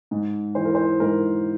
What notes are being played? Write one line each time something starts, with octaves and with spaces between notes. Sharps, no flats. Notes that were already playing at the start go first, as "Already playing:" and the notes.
G#2
E3 C5
A#4
C5
G#2 A#4